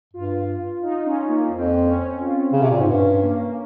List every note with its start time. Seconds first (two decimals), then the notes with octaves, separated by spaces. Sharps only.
0.14 G2 F4
0.83 D#4
1.06 C#4
1.29 A#3
1.51 F2 C4
1.86 C#4
2.20 F4
2.52 C#3 C#4
2.62 C3
2.71 A#2
2.80 G#2
2.88 G2 C#4
3.23 A#3